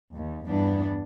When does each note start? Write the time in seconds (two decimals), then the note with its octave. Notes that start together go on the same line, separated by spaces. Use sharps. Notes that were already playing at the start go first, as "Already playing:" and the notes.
0.13 D#2
0.48 E2 G2 E3 B3 D4